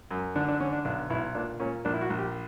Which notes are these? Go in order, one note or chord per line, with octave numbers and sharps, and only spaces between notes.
F#2
D3 D4
D4
D3 C#4
D4
B1 D4
B1 E4
A#2 D4
A#2 C#4
A#1 D4
E4
F#4
A#1
G4